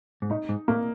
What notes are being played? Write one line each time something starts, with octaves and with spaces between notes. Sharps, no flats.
G#2
A2 D#4
G#2
A2 A#3